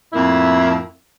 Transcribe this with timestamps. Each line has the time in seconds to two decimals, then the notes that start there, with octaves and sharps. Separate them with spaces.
0.13 F2 A2 A#3 E4